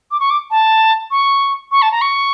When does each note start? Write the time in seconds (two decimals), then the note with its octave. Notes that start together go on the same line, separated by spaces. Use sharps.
0.11 D6
0.20 C#6
0.30 D6
0.51 A5
1.11 C#6
1.72 C#6
1.82 A5
1.92 A#5
2.01 C#6